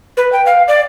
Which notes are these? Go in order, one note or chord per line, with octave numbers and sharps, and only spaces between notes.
B4
G5
F5
D5